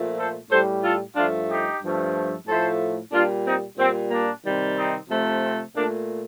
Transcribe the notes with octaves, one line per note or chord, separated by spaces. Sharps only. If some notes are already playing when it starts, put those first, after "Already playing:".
Already playing: A#2 F3 A3
A4 C5
A2 G3 A4 C5
F4 A4
G2 F3 A3 D4 F4
D#4 G4
G2 F3 A3
A2 F3 A3 A4 C5
A#2 G3 D4 F4
C4 D#4
A#2 G3 C4
A#3 D4
C3 D#3 G3
C4 D#4
C3 F3 A3
C4
A#2 A3 A#3 D4